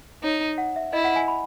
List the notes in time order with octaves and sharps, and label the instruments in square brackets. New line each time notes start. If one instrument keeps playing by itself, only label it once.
[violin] D#4 [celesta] C#5
[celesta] F#5
E5
[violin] E4 [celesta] D#5
[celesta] F#5
G#5
B5